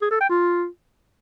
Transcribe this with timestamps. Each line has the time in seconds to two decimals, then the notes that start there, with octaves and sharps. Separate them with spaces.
0.02 G#4
0.11 A4
0.20 G5
0.30 F4